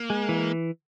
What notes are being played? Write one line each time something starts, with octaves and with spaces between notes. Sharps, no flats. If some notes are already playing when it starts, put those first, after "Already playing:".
Already playing: A#3
G#3
E3